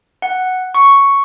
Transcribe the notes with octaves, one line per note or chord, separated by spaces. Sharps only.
F#5
C#6